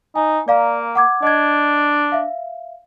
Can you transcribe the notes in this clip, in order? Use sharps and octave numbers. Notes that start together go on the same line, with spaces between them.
D#4 G#5
A#3 D5 F5 A#5
F#5 D6 G#6
D4 D#5 G#6
E5 F5